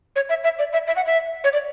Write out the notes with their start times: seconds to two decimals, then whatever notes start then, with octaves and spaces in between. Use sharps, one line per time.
0.16 C#5
0.29 E5
0.44 E5
0.59 D5
0.73 E5
0.87 E5
0.96 F#5
1.06 E5
1.44 C#5
1.53 D5